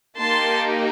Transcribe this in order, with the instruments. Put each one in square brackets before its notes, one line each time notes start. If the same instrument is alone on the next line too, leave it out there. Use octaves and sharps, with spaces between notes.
[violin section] A#3 D#4 G4 A5 C6